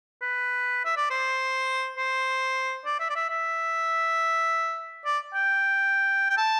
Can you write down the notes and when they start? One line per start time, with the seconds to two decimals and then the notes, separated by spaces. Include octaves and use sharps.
0.22 B4
0.85 E5
0.97 D5
1.10 C5
1.97 C5
2.85 D5
3.00 E5
3.10 D5
3.15 E5
3.29 E5
5.05 D5
5.34 G5
6.30 G5
6.37 A5